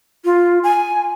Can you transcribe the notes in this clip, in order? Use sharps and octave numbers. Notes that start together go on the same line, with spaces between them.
F4
G#5